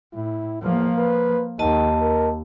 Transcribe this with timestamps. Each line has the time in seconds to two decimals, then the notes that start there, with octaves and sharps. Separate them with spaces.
0.13 A2 E4
0.62 E2 F3 A#3
0.98 B4
1.59 D#2 D#3 D#5 A5
2.02 A#4